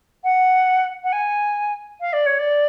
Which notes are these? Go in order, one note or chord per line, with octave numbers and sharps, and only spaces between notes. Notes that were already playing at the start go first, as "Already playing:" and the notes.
F#5
F#5
G#5
F5
D5
C#5
D5